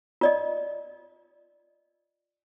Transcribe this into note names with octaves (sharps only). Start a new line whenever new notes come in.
F4 D5 D#5